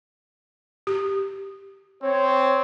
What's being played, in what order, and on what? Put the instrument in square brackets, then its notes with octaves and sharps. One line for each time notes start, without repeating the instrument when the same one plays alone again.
[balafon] G4
[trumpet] C4 [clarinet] C#5